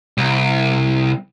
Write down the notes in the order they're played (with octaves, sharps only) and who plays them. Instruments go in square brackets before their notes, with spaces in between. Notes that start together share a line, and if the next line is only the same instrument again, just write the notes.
[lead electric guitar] C2